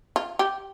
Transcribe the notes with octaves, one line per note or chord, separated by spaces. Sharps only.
F4
G4